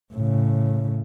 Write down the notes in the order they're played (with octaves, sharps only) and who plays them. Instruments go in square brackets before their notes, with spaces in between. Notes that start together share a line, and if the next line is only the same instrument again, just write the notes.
[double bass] A2 C#3